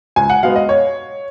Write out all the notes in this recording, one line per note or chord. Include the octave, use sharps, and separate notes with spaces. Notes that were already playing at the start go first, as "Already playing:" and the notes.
C#2 G#5
F#5
B2 G#3 B3 F5
D#5
C#5